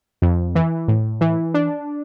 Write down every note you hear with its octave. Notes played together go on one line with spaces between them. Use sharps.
F2
E3
A2
E3
D4